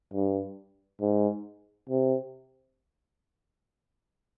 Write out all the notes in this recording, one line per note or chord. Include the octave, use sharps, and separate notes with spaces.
G2
G#2
C3